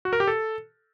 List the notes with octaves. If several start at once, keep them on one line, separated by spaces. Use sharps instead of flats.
F#4
A#4
G4
A4